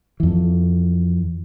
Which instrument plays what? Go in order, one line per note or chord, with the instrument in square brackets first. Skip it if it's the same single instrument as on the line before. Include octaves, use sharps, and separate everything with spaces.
[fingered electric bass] F2 E3